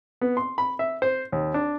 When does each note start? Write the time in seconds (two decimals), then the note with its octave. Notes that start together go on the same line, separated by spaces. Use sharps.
0.21 B3
0.37 C6
0.58 B5
0.79 E5
1.02 C5
1.32 D#2
1.54 D4